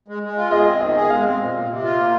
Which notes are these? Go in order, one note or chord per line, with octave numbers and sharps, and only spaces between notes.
G#3
G#3
F4
G#4 D#5
C4
D#3 D#5
G#4
G#3 F5
C4
A#2
A#2
C3
F4
A#3